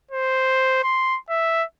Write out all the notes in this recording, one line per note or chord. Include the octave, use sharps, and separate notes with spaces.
C5
C6
E5